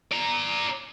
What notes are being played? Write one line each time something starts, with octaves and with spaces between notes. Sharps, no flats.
D5 A#5